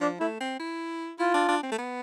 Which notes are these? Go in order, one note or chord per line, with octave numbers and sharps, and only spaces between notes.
F3 D4
A3 E4
C4
E4
E4 F4
D4
D4
C4
A3
B3